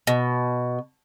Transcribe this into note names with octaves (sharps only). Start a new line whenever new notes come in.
B2